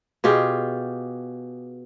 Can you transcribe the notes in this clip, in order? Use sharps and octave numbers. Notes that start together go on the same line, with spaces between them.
B2 F4 G4 G#4